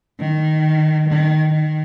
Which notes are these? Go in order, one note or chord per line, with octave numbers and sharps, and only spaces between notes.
D#3
D#3
D#3